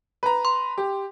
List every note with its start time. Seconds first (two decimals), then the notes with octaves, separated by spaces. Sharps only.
0.23 B4 A#5
0.45 C6
0.78 G4